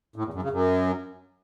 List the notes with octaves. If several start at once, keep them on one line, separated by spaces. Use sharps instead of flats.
A2
E2
F#2
C#3
F#2